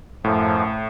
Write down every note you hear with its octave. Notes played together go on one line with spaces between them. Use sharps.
F#2 A2 F3